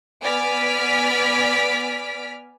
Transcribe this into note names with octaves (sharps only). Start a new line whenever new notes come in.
B3 D5 G#5 F6 B6 D7